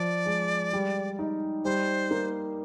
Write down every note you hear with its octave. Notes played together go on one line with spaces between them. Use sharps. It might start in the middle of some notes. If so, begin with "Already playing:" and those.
Already playing: F3 D5
G#3
G3
D#4
G3 C5
A#3